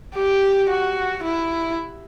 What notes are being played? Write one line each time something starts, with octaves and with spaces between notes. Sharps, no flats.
G4
F#4
E4